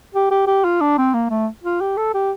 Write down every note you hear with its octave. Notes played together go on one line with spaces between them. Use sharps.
G4
G4
G4
F4
D4
C4
A#3
A3
F4
G4
A4
G4